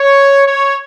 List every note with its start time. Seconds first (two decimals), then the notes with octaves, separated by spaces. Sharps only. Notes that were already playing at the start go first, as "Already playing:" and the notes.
Already playing: C#5
0.47 C#5